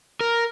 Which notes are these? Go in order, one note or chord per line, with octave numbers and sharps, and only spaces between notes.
A#4